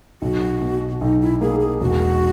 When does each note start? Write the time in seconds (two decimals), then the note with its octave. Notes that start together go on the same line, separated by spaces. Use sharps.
0.22 B1 F#4
0.61 B2
1.01 B1 D#4
1.21 E4
1.41 A#3 G#4
1.60 G#4
1.80 E1 F#4